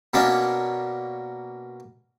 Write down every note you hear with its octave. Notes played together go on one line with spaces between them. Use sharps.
B2 A#3 C#4 D4